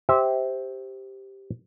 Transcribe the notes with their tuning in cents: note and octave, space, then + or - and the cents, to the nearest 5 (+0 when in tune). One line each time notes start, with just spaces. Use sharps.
G4 +0 C5 +0 E5 -20